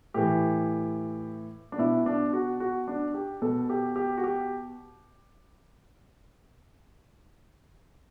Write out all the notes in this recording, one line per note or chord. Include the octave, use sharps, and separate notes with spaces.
A2 E3 G4
D4
B2 E4
D4
F#4
F#4
D4
G4
B2 A4
G4
G4
F#4
G4